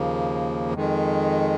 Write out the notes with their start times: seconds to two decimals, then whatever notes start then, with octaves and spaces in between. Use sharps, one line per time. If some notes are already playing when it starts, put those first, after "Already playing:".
Already playing: D#2 C#3 F3 A#3
0.73 F2 D#3 G#3